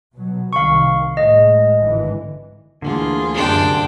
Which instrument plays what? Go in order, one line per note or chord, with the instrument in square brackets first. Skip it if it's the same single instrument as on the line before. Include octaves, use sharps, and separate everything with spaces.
[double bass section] B2 F#3
[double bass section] C2 C3 D#3 [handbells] F5 C#6
[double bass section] A2 G#3 [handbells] D#5
[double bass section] G#1 D3 E3
[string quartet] D2 F4 G#4 [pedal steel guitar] D3 [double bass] E3 A#3
[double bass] F#2 C3 [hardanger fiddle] D4 G5